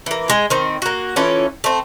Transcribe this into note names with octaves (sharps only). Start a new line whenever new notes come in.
E3 A#3
G#3 G#4
D#3 C4
A#3 F#4
E3 C#4 F4 A4
A3 C4